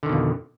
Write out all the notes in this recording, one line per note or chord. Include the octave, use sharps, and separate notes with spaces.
F2 B2 D3 D#3